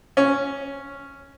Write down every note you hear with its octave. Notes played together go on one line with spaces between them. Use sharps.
C#4